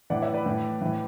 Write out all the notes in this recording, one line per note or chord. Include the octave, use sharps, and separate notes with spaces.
A2 E3 D5 F#5
C#5 E5
B4 D5
A2 E3
A2 E3